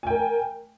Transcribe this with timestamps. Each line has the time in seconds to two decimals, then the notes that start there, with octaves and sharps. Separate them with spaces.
0.03 G#5
0.07 G5
0.10 A#4